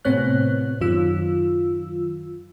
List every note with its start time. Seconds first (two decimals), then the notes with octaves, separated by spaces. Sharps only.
0.05 A2 C3 B3 C4 C#5 F#6
0.81 F#2 D#3 F4 E6